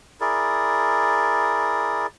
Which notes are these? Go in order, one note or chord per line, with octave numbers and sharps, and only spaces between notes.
E4 G#4 A#4 D5